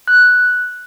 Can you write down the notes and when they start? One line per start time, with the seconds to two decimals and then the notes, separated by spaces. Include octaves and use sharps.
0.08 F#6